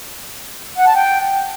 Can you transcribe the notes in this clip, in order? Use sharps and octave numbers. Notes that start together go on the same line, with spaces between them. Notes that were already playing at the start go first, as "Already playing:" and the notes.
F#5
A5
G5